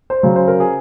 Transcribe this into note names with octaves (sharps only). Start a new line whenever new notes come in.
C5
C#3 F#3
C5
A#4
G#4